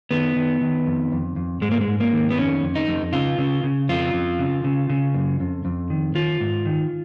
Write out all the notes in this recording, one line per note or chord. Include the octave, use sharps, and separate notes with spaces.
D#3 B3
D#3
D#3
F2
F2
F2
G#2 G#3
A#3
G#3
G#2
A#3
D#3
B3
F2 C#4
F2
D#4
F2
C#3 F4
C#3
C#3
F2 F4
F2
C#3
C#3
C#3
F#2
F2
F2
D#3
D#3 F4
G#2
D#3